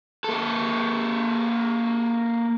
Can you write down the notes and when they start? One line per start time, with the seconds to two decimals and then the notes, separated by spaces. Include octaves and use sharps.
0.24 A#3 A4